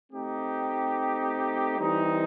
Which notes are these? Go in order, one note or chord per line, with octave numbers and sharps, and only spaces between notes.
A3 C4 D#4 G4
E3 G3 C4 D#4